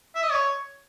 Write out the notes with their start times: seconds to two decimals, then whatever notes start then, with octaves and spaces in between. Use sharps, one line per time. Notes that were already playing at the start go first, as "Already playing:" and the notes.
0.15 E5
0.23 D#5
0.31 C#5